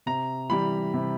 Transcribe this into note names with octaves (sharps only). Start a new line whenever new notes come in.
C3 A#5
E3 G3 B5
C3